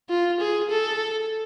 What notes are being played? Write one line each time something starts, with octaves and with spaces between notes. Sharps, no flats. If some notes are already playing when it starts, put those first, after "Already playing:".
F4
G#4
A4